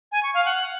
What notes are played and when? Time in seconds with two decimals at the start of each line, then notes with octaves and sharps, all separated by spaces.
0.12 G#5
0.23 C#6
0.34 F5
0.45 F#5